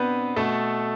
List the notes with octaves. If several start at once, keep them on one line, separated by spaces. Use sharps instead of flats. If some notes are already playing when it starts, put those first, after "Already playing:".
Already playing: B2 B3 C4 D4 B4 C5
B2 A3 A4